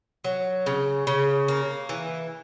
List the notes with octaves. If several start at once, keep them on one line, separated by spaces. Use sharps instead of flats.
F#3
C#3
C#3
A#3
E3